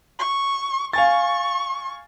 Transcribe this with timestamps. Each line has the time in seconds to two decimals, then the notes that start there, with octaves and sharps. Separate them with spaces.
0.19 C#6
0.93 F5 G#5 C#6 A6